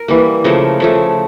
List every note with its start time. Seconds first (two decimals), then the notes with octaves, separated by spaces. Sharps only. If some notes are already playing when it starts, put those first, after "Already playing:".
Already playing: A#4
0.08 E3 G3 A#3
0.44 C#3 F3 A3 A#4
0.80 C#3 F3 A3